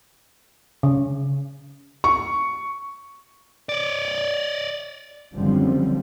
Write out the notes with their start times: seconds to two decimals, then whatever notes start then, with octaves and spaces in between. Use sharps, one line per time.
0.83 C#3
2.04 C#6
3.69 C#5 D5
5.35 F#1 F#2 D3 F3 G3 C4